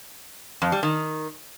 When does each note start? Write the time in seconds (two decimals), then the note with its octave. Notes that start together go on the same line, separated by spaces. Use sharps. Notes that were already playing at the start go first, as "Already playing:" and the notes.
0.62 F2
0.72 G3
0.83 D#3